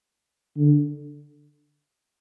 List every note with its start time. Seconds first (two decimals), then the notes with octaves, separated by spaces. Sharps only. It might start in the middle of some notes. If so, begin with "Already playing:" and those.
0.57 D3